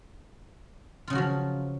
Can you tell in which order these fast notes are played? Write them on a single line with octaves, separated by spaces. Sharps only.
F4 C#3 F#3 F#4 F3